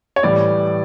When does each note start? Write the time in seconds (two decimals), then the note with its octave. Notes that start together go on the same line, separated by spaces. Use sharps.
0.16 C#5
0.23 A2 E3 G3 D5